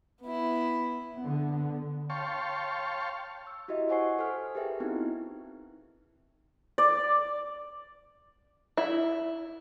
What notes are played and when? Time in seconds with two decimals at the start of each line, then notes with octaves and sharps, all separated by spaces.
0.21 B3 E4
1.20 D3 B3
2.10 C#5 F5 G5 A5 C6 C#6
3.47 E6
3.68 E4 F#4 G4 D#5 E5
3.89 C5 C#5 F#5 G#5 C#6 C7
4.19 A4 C5 G#5 F6
4.55 G4 G#4 A#4 B4 E5 G5
4.80 B3 C4 D#4 E4 F#4
6.78 D5
8.77 E4